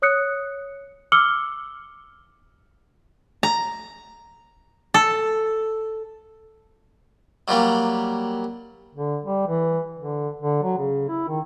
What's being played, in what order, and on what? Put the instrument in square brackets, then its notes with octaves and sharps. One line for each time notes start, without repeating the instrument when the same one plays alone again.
[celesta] C#5 D#6 F#6 C#7
D6 E6 F6 C#7 F#7 G7
[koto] A#5
A4
[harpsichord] F#3 G3 A#3
[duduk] D3
G3
E3
D3
D3
F#3
C#3
E4
D#3